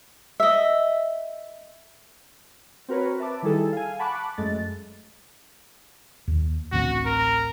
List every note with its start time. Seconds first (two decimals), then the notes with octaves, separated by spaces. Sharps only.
0.40 D#5 E5
2.88 C4 F#4 A#4 B4 C#5
3.18 B4 E5 A5 D6
3.42 D#3 G3 E4 G#4 A4
3.72 F5 G#5
3.99 F#5 A5 B5 C#6 D6 F#6
4.38 F#2 G#3 A3 A6
6.28 D#2
6.72 A1 D2 C4 F#4
7.06 A#4